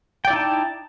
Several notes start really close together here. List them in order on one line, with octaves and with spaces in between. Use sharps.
G5 D5 E4 D#4 A5